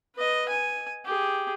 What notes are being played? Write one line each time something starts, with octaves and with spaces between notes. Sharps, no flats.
B4 D#5
G#5
G4 G#4